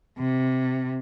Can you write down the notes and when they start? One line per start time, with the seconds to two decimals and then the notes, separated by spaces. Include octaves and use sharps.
0.18 C3